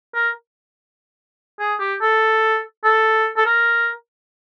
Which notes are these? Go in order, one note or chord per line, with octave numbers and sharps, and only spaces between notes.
A#4
G#4
G4
A4
A4
A4
A#4